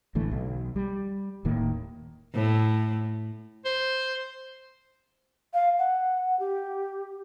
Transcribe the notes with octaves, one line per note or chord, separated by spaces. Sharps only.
A1 D3 E3 A3
B1
G3
D#1 A2 D#3 A#3
A2
C5
F5
F#5
G4